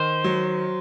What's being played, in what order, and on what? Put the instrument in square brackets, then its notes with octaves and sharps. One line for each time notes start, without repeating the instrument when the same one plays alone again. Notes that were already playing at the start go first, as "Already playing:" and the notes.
Already playing: [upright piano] D#3 [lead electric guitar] C5
[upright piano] F#3